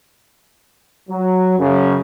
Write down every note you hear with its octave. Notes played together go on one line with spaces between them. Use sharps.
F#3
F#2 C#3